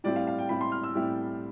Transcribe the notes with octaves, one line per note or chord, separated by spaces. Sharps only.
A2 G3 C4 E4 D5
F5
F5
G5
A2 G3 C4 E4 B5
C6
F6
E6
A2 G3 C4 E4